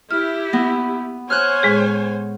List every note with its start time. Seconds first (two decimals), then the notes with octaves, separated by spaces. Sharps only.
0.11 E4 G4 F6
0.53 B3 A#6
1.30 C5 C#5 G#5 F6 F#6
1.63 A2 G#3 G#4